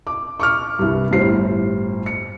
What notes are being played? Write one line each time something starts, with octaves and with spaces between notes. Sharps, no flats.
D6
C#6 D6 F6
C2 G2
G1 A2 G3 C5 C7
C#7